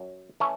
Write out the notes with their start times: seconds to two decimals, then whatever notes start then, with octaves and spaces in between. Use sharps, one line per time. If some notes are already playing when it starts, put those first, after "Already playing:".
Already playing: F#2 F#3
0.40 E3 A3 C#4